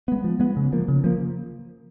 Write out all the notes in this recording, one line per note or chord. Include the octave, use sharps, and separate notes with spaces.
G#3 B3
F3
G#3 B3
C#3
F3 A#3
C#3
F3 A#3